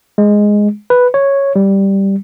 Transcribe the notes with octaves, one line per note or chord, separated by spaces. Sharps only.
G#3
B4
C#5
G3